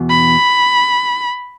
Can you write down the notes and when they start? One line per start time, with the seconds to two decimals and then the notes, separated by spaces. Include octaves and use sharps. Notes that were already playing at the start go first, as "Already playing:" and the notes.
Already playing: E2 B2 B3
0.10 B5